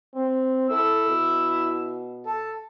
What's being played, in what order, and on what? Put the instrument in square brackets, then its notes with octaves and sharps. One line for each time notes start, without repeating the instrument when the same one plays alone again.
[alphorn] C4
[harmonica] E4 E6 [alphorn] A4
[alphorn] B2
[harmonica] A4